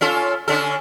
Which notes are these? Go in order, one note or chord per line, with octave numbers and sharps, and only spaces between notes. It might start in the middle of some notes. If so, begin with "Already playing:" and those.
C#4 F4 A4
D3 C#4 A4